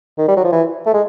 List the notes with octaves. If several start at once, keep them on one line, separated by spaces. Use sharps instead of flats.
D#3
G3
F#3
F3
E3
A3
G#3